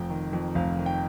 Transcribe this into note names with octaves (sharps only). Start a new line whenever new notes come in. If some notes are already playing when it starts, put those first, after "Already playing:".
Already playing: F1 F2 G5
D#3
F2
F1 F5
D#3
G5